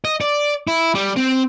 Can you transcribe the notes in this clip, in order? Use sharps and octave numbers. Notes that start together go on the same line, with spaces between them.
D#5
D5
E4
G3
C4